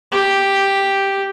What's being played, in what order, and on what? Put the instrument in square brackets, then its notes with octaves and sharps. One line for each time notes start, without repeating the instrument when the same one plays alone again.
[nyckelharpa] G4